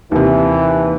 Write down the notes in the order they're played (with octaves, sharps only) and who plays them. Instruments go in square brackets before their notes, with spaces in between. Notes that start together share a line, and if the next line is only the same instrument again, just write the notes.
[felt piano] D#2 C3 [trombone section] E3